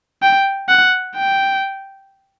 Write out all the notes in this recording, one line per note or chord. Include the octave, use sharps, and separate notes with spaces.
G5
F#5
G5